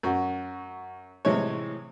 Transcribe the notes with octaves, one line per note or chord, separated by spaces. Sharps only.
F#2 F#4
A2 C3 E3 G#3 C#5